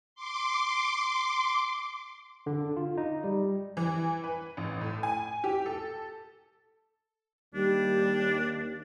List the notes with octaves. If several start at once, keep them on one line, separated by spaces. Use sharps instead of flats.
C6 D6
D3
F4
D#4
G3
E3
B4
A1
A2
G#5
G4
A4
D#2 G3 D4